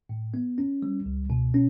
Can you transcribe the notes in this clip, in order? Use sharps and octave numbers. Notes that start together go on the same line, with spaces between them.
A2
B3
C#4
G3
C#2
B2
C#4